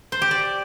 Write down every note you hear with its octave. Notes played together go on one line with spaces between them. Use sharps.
C5
G4
D5